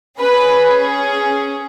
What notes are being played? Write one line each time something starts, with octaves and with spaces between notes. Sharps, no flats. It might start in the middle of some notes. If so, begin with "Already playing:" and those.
C#4 G#4 B4